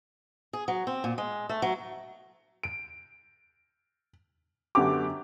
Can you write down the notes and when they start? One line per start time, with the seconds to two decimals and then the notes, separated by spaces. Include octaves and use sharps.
0.53 G#4
0.68 F#3
0.87 C4
1.04 A#2
1.18 G#3
1.49 A3
1.62 F#3
2.63 D7
4.75 F#2 D3 B3 G4 D6